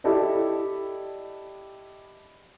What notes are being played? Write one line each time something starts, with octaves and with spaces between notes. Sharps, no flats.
E4 G4 A4 D5 D#5